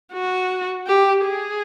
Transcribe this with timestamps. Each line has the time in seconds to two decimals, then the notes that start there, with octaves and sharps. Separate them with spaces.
0.13 F#4
0.87 G4
1.24 G#4